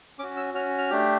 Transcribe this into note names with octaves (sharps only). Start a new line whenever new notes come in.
C#4 F#4 D6
E6
C#4 F#4 F6
F6
A3 D4 G4